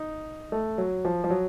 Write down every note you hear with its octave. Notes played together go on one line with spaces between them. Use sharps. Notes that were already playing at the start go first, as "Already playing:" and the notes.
Already playing: D#4
A3
F#3
F3
F3
F#3